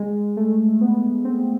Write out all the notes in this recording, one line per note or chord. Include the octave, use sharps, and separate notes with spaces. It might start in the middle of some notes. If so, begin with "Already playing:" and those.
Already playing: G#3
A3
B3
C4